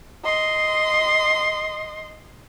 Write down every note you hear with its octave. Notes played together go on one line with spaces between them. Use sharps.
D#5 C6